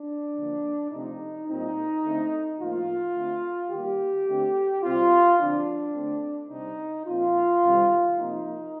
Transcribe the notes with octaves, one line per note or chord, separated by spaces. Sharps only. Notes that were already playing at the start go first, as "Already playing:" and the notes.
Already playing: D4
D3 F3 A#3
C3 F3 A3 C4 D#4
A#2 G3 C4 D#4
D3 A3 C4
A2 F3 A#3 F4
D3 A3 C4
D#3 G3 A#3 G4
D3 A3 C4
C3 G3 C4 F4
D3 F3 C4 D4
D3 A3 C4
C3 G3 C4 D#4
A#2 F3 C4 F4
C3 D#3 G3 C4
C3 F3 A#3 D#4